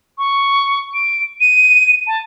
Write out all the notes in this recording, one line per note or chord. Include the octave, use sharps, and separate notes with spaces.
C#6
D7
D#7
A5